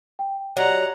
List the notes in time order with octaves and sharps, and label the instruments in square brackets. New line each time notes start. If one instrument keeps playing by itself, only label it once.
[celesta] G5
[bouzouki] F#3 [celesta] G4 D5 D#5 [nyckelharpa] F#5 A#5